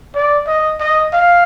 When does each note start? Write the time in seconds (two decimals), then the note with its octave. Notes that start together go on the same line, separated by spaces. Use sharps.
0.15 D5
0.47 D#5
0.80 D#5
1.13 F5